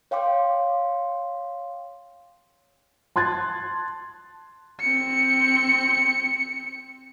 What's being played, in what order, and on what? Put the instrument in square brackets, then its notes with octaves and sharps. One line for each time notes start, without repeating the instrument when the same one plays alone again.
[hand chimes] C#5 F5 G5 C6 D6
[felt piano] A5 C6 F#6 G#6 A6
[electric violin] C4 C#7